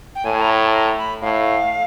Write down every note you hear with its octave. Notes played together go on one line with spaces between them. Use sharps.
G5
A2 G#5
A#5
A5
A#5
B5
A2 F5